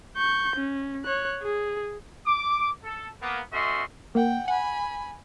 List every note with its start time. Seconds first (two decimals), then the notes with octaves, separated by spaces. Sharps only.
0.17 C#6 G6
0.56 C#4
1.05 C#5 F#6
1.42 G#4
2.27 D6
2.84 A4
3.22 A#3 B3
3.53 A3 C#4 F#4 D#5 E5 C6
4.15 A#3 F#5 G5
4.48 F#5 G#5 B5